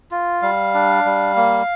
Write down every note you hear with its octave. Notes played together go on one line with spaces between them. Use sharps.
F4
G3 F5
D4
G3
A#3